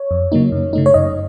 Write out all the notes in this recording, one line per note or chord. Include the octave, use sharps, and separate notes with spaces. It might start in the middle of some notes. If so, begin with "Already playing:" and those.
Already playing: C#5
F2
C#3 F#3 A#3 D#4
F#2
C#3 A3 D#4
C#5
F#2 D#5